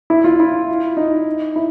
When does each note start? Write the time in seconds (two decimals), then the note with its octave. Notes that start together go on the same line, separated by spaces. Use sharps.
0.10 E4
0.24 F4
0.40 E4
0.97 D#4
1.56 E4